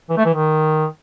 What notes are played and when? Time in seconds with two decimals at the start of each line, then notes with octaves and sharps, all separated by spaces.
0.10 E3
0.18 A3
0.26 E3
0.34 D#3